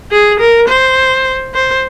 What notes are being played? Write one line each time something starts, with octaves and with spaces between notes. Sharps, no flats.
G#4
A#4
C5
C5